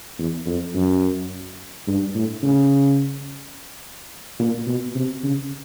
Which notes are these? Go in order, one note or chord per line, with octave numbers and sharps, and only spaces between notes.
E2
F2
F#2
G2
A2
C#3
A#2
B2
C3
C#3